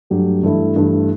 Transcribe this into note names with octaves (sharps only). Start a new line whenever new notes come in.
G2 F#3 A3 D4 G4
G2 E3 A3 E4
G2 E3 A3 E4